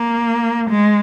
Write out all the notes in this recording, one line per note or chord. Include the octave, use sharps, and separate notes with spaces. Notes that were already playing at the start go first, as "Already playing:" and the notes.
Already playing: A#3
G#3